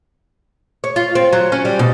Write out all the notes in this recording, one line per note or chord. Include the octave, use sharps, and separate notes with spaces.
C#5
F4
C4
F#3
C#4
G3
B2